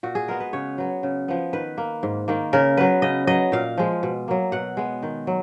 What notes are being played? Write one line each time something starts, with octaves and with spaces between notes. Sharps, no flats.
A#2 F#4
G#4
G#3 B3 A#4
B4
C#3 C#5
F#3 B3
C#3
F3 B3
D#3 B4
A#3
G#2
D#3 A#3
C#3 A#4
F#3 B3 B4
C#3 D#5
F#3 B3 D#5
A#2 F5
F3 G#3
B2
F#3 A#3
B2 F#5
G#3 B3
D#3
F#3